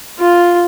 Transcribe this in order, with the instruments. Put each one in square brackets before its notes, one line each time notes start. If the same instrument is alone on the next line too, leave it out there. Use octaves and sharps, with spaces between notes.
[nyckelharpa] F4